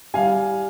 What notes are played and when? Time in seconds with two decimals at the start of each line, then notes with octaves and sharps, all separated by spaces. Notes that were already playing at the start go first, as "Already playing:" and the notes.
0.14 G3 F5 G#5